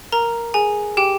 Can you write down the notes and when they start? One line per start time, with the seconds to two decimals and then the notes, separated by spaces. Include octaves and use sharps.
0.12 A#4 A#5
0.54 G#4 G#5
0.97 G4 G5